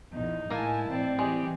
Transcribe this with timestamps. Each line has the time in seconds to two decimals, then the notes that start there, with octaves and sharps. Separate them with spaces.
0.13 A#1 E2 D#4
0.50 A2 G#3 A#3 E4 A#4 G#5 A5
0.89 A2 E3 C4 D5
1.19 E3 G#3 G4 G#4